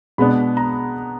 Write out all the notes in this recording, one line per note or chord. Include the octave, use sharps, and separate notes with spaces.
B2 G#3 B3 D4 B5
A#5